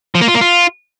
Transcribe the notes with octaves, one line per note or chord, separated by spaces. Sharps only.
F3
A#3
F4
A#3
F4